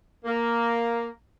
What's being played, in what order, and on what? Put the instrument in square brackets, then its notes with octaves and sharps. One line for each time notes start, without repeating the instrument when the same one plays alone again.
[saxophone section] A#3